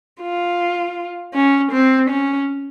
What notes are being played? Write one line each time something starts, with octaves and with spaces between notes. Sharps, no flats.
F4
C#4
C4
C#4